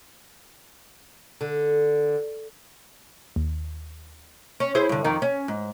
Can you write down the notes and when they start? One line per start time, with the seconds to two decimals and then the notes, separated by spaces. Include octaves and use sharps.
1.41 D3
3.36 D#2
4.60 C#4
4.75 E4 G#4 C5
4.89 G2 D3
5.05 F2 D#3
5.22 C#4
5.48 G#2